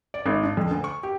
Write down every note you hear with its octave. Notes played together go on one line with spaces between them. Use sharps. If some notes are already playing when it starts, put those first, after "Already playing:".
D5
G#1
D4
F2
D2
C#6
G4